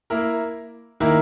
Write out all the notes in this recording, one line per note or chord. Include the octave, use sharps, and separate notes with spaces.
A#3 E4 A#4
D#3 A#3 E4 A#4